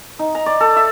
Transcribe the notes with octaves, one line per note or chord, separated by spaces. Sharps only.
D#4
A#5
D5
A4
E5